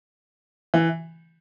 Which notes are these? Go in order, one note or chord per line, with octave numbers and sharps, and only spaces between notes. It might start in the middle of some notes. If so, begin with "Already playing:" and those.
E3